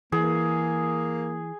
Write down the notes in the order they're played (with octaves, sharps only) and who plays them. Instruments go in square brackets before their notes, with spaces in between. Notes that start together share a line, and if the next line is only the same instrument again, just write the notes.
[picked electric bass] E3 [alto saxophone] A#3 [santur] G#4